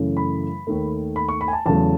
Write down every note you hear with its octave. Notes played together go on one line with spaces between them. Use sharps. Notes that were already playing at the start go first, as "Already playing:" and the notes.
Already playing: F#2 C#3 E3 A3
B5
D#2 D#3 A3
B5
C#6
B5
G#5
A5
E2 C#3 F#3 A3 A5